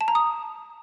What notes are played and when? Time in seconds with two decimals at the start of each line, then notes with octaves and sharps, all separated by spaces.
0.01 A5
0.08 A#5
0.15 D#6